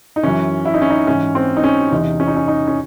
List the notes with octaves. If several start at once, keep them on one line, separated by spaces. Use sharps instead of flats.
D#4
F#2 E3 C#4
E4
D#4
C#4
D#4
G#2 E3 C#4
C4
D#4
C#4
E2 C3 E3 D#4
C#4
D#4
C#4
D#4
C#4